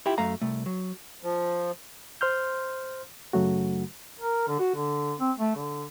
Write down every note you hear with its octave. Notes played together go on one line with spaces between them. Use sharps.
E4 F4 G4 G5
F#2 A3 F5 A#5
C2 A3
F#3
F3
C5 C6 F6 G6
F#2 C#3 F#3 A3 F#4
A#4
D3
F#4
D3
C4
A3
D3